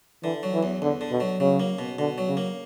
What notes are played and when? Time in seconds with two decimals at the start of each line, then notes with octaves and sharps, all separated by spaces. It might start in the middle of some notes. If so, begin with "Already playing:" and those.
0.23 D3 E3
0.43 F#3
0.54 E3
0.63 E2
0.82 E2 D3
1.01 D3
1.11 B2
1.20 F#3
1.40 C#3 F#3
1.60 A#3
1.79 B2
1.99 B2 D3
2.18 F#3
2.28 C#3
2.37 A#3